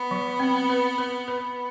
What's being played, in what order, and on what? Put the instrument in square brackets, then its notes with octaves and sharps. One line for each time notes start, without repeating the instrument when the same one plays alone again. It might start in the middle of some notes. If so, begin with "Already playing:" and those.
Already playing: [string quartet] B3
[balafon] F#3
C4
B4
B4
B4